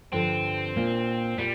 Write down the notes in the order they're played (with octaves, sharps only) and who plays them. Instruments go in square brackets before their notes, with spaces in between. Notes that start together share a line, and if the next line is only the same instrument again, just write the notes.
[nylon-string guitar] G2 D3 F3 [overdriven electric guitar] C4
[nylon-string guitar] A#2 A#3 D4
[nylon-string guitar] A#2 [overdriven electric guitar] G3